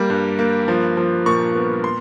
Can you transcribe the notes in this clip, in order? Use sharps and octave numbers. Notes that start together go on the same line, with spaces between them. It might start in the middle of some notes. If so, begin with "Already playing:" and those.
Already playing: G3 A#3
G2
A#3
F3
F3
A#2 C#6
B3
C6